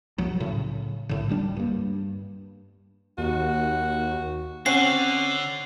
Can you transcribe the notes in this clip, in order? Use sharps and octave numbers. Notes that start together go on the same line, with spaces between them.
C2 F3 F#3
A2 C#3
C2 A2 D3
D1 G3 D4
G2 A#3
D#2 F#4
D3 C4 C#4 F#4 C7